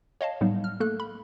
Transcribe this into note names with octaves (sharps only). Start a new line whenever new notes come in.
C#5 D#5 F5 A5
A2 F#3 G3 B3 D#4
F6
A3 A#3 A4 F#6
B5